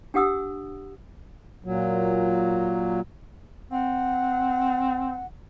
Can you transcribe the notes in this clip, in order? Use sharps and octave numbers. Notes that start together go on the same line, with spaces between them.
D4 G4 F#5 D#6 E6
A#2 F#3
C4 F#5